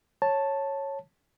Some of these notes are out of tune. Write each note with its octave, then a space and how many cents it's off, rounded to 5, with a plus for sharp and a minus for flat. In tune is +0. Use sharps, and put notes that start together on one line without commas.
C#5 -10 A5 +0